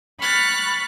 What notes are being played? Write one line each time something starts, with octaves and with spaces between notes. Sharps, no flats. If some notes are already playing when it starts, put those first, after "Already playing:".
B5 C#6 F6 F#6 A6